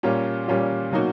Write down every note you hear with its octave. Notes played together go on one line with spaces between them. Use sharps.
A#2 G3 A#3 C#4 F4
A#2 G3 A#3 C#4 F4
B2 F#3 A#3 D#4 F#4